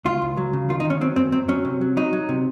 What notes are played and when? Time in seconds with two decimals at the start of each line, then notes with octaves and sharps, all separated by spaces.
0.05 C#2 F4
0.22 C#2
0.37 F#3
0.53 C#3
0.69 D#3 F4
0.80 D#4
0.85 D#3
0.90 C#4
1.01 F#3 C4
1.16 F#2 C4
1.32 F#3 C4
1.48 F#3 C#4
1.65 C3
1.81 F#3
1.97 F#3 D#4
2.13 F#3
2.29 C3